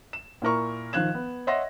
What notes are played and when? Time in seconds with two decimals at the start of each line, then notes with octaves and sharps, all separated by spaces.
0.13 E7
0.42 A#2 E4 A#4 C#6
0.93 D#3 F3 F5 F#6 G#6 E7
1.14 B3
1.47 C#5 D#5 E5 F#5 C6 A#6